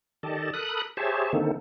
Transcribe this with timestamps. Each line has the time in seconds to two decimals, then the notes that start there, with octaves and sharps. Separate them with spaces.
0.23 D#3 G4 A4 D5 D#5 A5
0.54 A4 A#4 B5 D#6 F#6
0.97 G4 G#4 C5 C#5 E5 A5
1.33 D3 D#3 A#3 C4 D#4 A4